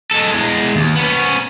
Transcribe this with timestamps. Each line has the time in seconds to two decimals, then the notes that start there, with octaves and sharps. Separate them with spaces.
0.11 G#3 A4
0.32 E2 G#3
0.76 D#2
0.96 B3 C#4